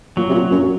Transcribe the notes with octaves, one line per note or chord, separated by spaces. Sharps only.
A#2 F#3
C3
A#2
F#2